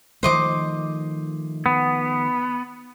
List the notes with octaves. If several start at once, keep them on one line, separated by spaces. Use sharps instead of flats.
D#3 F3 A3 C5 D#5 D6
B3